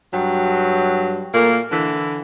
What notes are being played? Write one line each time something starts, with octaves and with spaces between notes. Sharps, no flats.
G2 F#3
A#2 A3 A#3
D3 E3